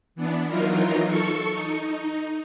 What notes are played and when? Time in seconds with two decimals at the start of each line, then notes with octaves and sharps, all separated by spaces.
0.15 E3 B3 D4
0.48 E3 F#3 D#4 F4 A#4
1.07 A4 C#6 C#7
1.52 D#4